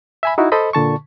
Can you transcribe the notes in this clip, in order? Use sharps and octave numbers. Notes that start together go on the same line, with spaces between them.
E5 G#5 B5
D#4 E4 F#4
A4 C5 D#5 B5
A#2 D3 A5 C#6